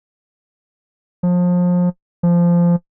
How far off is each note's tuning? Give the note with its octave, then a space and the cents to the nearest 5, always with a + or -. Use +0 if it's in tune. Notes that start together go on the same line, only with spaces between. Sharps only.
F3 +30
F3 -15